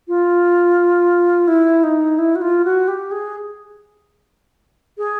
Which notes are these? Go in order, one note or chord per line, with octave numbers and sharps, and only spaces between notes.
F4
E4
D#4
E4
F#4
F4
F#4
G4
G#4
G#4